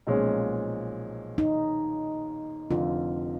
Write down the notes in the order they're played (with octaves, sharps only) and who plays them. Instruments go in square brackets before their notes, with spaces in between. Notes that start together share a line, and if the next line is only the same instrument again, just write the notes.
[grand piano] B1 A#2 F3 G#3 C#4
[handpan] D#4
[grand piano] F1 F2 D3 [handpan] F4